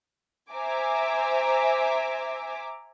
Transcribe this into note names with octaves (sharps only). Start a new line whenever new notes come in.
C5 E5 G#5 A#5 D6